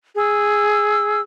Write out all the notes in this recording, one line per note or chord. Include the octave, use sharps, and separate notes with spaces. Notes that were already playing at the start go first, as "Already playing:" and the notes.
G#4 E6